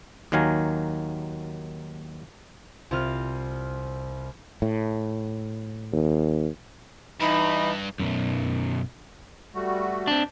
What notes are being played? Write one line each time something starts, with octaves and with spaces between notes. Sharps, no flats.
D#2 D#3 F#3 F5 G#5 A#5
C2 C4 F4 F6
A2
D#2
G2 E3 D#4 B5
B1 F#2
G3 A3 F#4
C4 D4